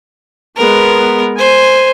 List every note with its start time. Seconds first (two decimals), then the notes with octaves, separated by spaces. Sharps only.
0.57 G#3 B3 A#4
1.38 C5 G#5